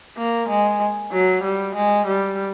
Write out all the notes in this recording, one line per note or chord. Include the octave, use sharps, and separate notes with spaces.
A#3
G#3
F#3
G3
G#3
G3